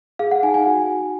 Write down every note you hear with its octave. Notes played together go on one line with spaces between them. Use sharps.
G#4 F5
F#5
D#4 G#5
G#5
F#4 G#5